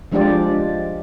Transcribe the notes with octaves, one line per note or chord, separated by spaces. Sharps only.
F3 G#3 D4 F4 G4 D5